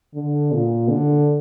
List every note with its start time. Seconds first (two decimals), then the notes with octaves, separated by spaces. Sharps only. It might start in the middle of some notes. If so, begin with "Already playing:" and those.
0.14 D3
0.52 A#2
0.90 D3